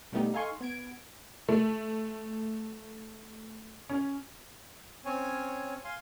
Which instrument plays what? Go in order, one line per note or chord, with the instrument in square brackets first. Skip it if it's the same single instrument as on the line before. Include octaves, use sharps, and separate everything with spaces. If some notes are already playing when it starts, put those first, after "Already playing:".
[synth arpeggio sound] B2 G3 A3 B3 D#4 G4
D#4 A4 F5 G#5 C6 C#6
B3 G#6 D7
[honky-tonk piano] A3
C#4
[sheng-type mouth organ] C4 C#4 C#5 G#5
F5 G#5 C6